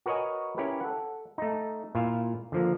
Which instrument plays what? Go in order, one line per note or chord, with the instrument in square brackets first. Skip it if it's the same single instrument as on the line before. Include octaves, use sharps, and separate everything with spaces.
[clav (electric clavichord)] F#4 A#4 B4 C#5 D#5 G#5
C#4 E4 G4 A#4 B4
A4 F#5
A3 D#4
A#2 E4 F4 E5 F5
D3 F3 A#3